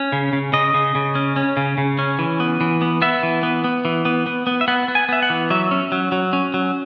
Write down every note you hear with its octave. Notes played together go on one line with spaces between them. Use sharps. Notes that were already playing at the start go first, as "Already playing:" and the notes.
Already playing: C#4
C#3
C#3
C#3 D#5
C#3
C#3
C#4
C#4
C#3
C#3
C#4
E3
B3
E3
B3
B3 E5
E3
B3
B3
E3
B3
B3
B3
E5
B3 F#5
B3
G#5
B3 E5
F#5
E3
F#3 E5
C#4
F#3
F#3
C#4
F#3